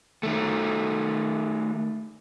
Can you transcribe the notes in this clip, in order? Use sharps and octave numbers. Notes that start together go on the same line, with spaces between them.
D#3 A3